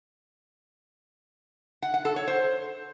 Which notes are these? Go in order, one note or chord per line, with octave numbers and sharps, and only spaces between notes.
F#5
F#5
A4
C#5
C5